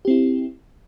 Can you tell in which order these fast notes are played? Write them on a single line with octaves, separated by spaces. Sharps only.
G4 C4 E4